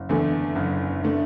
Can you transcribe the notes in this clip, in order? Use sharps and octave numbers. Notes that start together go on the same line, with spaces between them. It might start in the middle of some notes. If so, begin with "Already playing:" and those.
Already playing: F#1
E2 D3 A3
F#1
D3 A3